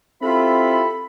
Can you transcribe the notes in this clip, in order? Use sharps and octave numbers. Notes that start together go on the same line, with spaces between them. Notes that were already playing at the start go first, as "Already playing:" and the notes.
C4 E4 F4 G4 A4 B5